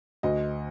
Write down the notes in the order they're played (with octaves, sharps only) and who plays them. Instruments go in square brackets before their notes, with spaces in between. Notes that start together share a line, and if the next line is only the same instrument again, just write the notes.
[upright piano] D2 D#5